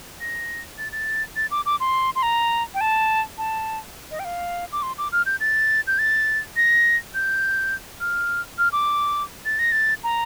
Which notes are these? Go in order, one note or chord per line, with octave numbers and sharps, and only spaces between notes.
A#6
A6
A6
A6
D6
D6
C6
C6
A#5
G5
A5
A5
D#5
G5
F5
D6
C6
D6
F6
G6
A6
G6
A6
A#6
G6
F6
F6
D6
A6
A#6
A6
A#5